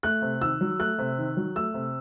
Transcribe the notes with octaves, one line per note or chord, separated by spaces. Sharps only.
A3 F#6
C3
D#3 E6
F#3
A3 F#6
C3
D#3
F#3
A3 E6
C3